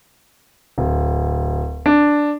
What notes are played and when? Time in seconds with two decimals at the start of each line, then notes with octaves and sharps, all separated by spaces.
0.78 D1
1.86 D4